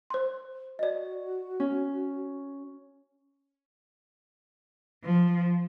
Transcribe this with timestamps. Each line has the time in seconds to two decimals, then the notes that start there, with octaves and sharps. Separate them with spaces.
0.10 C5 C6
0.79 F#4 D5 D#5
1.60 C#4
5.05 F3